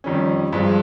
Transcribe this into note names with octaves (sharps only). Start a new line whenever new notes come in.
F2 D#3 G3 C#4
G2 F3 G#3 C4